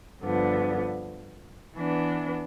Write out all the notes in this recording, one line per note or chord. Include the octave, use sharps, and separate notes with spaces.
G2 D3 F3 B3
E3 B3 D4